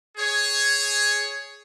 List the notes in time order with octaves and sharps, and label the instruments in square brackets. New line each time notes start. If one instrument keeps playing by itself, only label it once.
[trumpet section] G#4 C#5